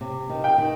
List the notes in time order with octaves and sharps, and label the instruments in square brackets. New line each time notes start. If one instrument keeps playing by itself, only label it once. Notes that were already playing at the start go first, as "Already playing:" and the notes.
[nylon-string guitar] C3
D#3
[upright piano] G5
[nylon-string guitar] D#3